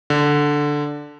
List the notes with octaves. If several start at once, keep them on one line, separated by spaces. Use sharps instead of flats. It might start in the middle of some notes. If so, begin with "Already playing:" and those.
D3